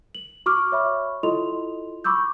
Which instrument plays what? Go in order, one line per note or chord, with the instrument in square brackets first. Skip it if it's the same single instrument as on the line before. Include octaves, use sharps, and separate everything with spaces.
[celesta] F#7
F#4 C#6 D6 F6
C#5 E5 B5 C#6
E4 F4 A4 D#5 C6 F7
B5 C#6 D6 E6 G6